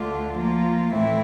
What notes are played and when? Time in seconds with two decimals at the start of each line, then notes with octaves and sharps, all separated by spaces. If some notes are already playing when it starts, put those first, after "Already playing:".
Already playing: D2 D3 A3 D4 F4
0.34 F3 A#3 F4
0.92 A2 E3 A3 C4 E4